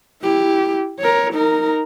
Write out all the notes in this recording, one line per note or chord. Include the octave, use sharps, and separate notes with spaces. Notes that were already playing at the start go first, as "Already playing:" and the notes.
E4 G4
A#4 C#5
D#4 A#4